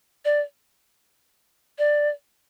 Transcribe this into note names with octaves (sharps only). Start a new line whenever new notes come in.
D5
D5